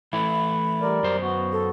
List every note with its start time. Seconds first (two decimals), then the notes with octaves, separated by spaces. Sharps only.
0.13 E3 A3 E4 B5
0.82 G3 A#4 D5
1.03 F#2 C5
1.22 B3 F#4
1.52 A4